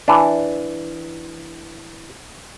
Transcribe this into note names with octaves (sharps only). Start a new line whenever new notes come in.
E3 D4